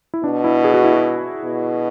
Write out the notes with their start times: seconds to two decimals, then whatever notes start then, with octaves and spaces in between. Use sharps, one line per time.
0.14 E4
0.24 B2 D4
0.44 E4
0.64 G#4
0.74 F#4
0.84 E4
0.94 F#4
1.45 B2